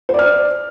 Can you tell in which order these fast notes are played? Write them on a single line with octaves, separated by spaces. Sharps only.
C5 D5 F6